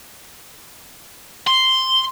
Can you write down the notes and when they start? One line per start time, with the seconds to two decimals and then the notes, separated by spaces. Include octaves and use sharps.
1.47 C6